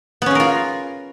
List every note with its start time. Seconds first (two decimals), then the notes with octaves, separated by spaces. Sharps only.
0.22 B3
0.26 C#4
0.31 G#4
0.35 A#4
0.40 F4